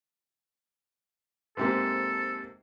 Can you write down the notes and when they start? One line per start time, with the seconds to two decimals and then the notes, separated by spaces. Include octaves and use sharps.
1.57 G#2 C3 A#3 A4